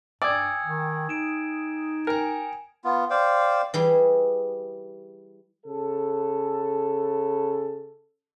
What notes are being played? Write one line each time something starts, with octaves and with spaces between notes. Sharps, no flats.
G2 D5 G5 G#5 D#6 E6 G#6
D#3
D#4 D7 E7
A#4 G5 G#5
B3 F4
C5 D5 F5 G5
E3 G3 G#4
C#3 A4